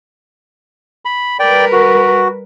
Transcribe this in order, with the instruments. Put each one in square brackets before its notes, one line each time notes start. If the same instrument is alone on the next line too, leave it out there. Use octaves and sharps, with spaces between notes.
[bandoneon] B5
[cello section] G3 A#4 B4 [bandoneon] D5 G5
[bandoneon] F#4